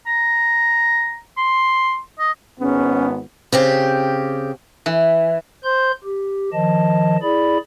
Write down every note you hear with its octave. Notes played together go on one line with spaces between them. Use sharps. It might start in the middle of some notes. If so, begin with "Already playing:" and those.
A#5
C6
D#5
G#1 G#2 B3 C#4
C#3 C4 G4
E3
C5 C6 G6
G4
D#3 F3 D#5 A5
E4 G#4 D5 B5